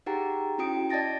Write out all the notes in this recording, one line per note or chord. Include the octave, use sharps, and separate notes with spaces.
D#4 G4 G#4 F#5 G5 A#5
C#4 E4 F#4 G5 D#6 D7
D5 D#5 A5 A6 A#6 D7